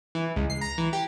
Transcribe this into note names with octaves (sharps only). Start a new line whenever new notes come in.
E3
C#2
C7
A#5
E3
G4